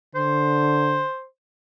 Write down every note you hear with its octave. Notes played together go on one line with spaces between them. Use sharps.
D3 C5